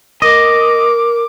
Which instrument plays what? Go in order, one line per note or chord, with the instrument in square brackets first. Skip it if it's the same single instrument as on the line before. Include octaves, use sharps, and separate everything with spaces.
[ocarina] A#4 [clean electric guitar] D#5 [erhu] D6